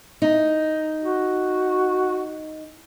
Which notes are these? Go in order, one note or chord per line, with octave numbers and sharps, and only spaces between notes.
D#4
F#4